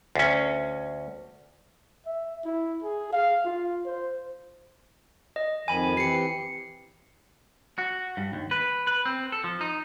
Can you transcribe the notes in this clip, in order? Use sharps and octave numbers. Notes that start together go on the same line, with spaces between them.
D2 C#4
E5
E4
G#4
F5
F4
C5
D#5
F2 D#3 F3 G#5 B5
E3 C4 G4 C7 C#7
F#4
G2
D#2
B4
B4
C4
A4
F3
D#4